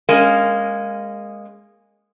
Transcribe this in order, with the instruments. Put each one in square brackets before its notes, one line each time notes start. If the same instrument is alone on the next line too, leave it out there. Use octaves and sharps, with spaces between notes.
[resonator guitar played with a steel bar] G#3 A#3 C#4